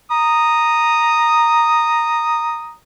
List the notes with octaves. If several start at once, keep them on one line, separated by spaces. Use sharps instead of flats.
A#5 D#6